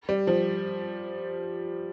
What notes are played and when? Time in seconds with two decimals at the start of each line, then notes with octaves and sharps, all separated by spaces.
0.09 G3
0.27 F3